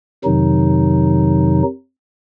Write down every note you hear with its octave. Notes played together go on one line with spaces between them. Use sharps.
F2 C3 D#3 F#3 D#4